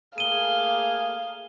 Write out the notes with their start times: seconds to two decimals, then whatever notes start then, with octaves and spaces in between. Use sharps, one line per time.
0.18 A3 A#3 G#4 F5 D#7 G7